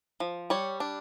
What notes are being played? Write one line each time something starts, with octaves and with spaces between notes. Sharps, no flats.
F3
G3 C#5
D4